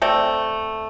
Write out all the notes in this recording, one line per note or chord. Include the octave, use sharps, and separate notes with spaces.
A3 C4 D5